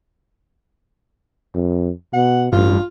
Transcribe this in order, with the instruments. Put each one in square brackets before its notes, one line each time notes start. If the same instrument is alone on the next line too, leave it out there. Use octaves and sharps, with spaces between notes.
[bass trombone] F2
[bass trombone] B2 [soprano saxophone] F#5
[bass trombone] A1 [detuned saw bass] G2 [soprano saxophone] F4